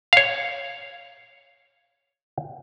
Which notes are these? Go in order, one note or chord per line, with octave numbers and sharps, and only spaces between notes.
C#5 F5